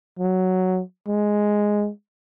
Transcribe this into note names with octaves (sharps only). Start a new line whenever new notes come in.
F#3
G#3